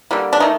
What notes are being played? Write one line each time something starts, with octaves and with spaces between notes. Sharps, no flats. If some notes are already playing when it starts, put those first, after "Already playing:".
D3 G3 A#3
D4
D#3 A3 D#4